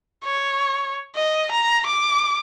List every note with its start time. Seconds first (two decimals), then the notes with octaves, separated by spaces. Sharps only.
0.25 C#5
1.15 D#5
1.52 A#5
1.86 D6